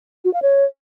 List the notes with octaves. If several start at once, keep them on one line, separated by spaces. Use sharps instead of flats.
F#4
F5
C#5